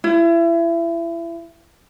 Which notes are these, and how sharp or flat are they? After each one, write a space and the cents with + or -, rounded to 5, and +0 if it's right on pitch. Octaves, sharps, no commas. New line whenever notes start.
E4 +30